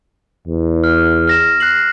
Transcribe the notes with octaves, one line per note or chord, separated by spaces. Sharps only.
E2
F6
F6 A#6 E7
F#6 C7 F#7